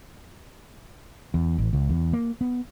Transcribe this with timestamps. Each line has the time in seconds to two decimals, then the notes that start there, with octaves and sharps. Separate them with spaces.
1.34 E2
1.58 A1
1.73 C#2
1.89 E2
2.13 A#3
2.41 B3